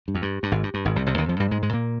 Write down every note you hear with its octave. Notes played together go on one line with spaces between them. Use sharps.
G2
F2
G2
G2
G#1 G#2
G2
G2
G#1 G#2
C2 C3
C2 C3
D#2 D#3
F2 F3
G2 G3
G#2 G#3
G#2 G#3
A#2 A#3